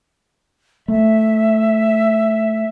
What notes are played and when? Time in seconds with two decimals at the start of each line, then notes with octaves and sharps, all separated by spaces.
0.88 A3 E5